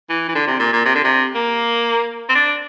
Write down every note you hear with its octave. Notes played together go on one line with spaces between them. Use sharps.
E3
E3
D3
C3
A#2
A#2
C3
D3
C3
A#3
C4
D4